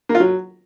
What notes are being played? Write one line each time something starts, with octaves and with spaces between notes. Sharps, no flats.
A#3
F4
F#3